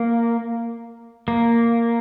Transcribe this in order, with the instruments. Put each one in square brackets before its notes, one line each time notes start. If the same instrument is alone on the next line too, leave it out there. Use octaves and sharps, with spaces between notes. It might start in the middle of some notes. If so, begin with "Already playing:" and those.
Already playing: [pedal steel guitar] A#3
A#3